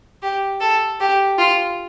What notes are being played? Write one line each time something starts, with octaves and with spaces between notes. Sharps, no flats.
G4
A4
G4
F4